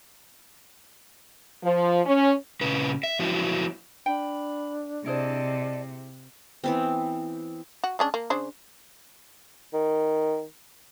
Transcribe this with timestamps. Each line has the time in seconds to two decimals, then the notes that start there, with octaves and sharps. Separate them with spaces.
1.64 F3
2.06 C#4
2.61 A#2 C#3 B4
3.03 E5
3.19 F3 F#3 B3 E4 F#4
4.06 D4 G5 B5
5.06 C3 E4 G#4 C5 D5 D#5 A5
6.64 E3 B3 C4
7.84 F#4
7.99 G#3 C#4 D4
8.14 A#3
8.30 C#3 D4 C5
9.74 D#3